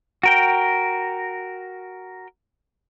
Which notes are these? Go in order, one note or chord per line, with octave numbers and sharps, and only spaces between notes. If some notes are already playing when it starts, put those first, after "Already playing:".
F#4 A#4 G5